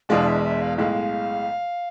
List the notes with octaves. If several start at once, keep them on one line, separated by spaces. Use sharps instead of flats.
E1 E2 B2 G#3 D4 F5
E5
E5
F5
B1 A2 G#3 F5